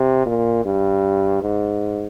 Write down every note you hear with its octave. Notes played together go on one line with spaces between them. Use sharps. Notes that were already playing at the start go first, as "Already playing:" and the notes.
Already playing: C3
A#2
G2
G#2